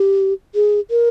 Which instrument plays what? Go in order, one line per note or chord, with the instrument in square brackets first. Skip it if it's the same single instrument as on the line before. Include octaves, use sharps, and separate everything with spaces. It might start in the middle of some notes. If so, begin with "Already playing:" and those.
Already playing: [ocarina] G4
G#4
A#4